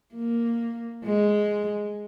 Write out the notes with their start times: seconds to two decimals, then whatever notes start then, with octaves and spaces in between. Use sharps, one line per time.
0.14 A#3
1.05 G#3